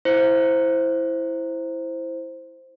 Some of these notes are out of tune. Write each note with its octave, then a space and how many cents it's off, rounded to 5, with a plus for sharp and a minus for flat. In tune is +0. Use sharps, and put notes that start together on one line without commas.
E4 +0 C5 +0